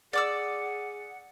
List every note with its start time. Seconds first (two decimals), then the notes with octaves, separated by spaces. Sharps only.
0.13 G#4 D5 F#5 D6 E6